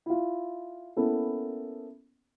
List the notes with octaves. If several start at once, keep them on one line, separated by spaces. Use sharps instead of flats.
E4 F4
A#3 B3 C#4 E4 A4